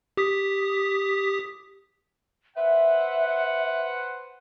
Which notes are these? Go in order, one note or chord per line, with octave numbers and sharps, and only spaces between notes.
G4 D#6 B6
B4 C5 E5 F#5